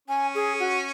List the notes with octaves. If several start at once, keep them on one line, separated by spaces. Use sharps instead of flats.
C#4 G#5
G#4
F#4